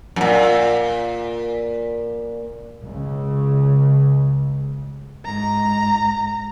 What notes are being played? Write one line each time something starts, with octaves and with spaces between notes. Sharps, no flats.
F#2 A#2
C#2 C#3
G#2 A#5